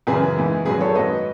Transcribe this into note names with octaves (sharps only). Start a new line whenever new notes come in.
F#2 C#3 E3 G#4 B4
G#2 E3
F#2 D#3 F#3 G#4 B4
A4 C#5
G#2 F#3 B4 D#5